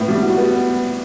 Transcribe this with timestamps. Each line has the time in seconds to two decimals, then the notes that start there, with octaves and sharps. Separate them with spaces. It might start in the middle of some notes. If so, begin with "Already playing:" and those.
Already playing: A2 B3
0.08 G3
0.22 F#4
0.38 B3